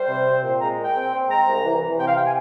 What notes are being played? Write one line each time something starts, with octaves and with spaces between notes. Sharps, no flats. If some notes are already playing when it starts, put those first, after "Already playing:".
Already playing: G3 C5
C3
C4
A#2
G#3 A#5
A#2
G5
C4
C4
G#3 A#5
C2
E3
E3
C3 G5
F5
G5
G#5